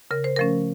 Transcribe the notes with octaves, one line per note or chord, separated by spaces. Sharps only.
C#3 A#4
C5
F3 A3 C#4 A#4